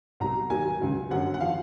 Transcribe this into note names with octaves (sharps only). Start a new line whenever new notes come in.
C2 B2 F#3 A#5
D#2 D#3 F#3 G#5
C#2 C#3 F#3
G1 F#2 D3 F#5
F#5
F3 F5